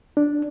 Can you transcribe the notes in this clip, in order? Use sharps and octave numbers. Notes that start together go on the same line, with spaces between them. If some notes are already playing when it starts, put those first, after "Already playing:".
D4